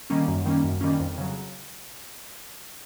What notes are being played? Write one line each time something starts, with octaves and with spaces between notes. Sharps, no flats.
D#3 G3 A#3 C#4
F#2
D#3 G3 A#3 C#4
F#2
D#3 G3 A#3 C#4
F2
C#3 F#3